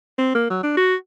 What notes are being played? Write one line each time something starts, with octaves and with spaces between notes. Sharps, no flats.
C4
A#3
F#3
D4
F#4